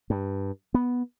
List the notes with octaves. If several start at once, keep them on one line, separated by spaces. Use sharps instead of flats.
G2
B3